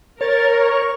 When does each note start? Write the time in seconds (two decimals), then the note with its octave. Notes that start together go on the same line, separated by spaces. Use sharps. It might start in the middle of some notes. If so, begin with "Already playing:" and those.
0.21 A#4 C#5 A6
0.60 C#6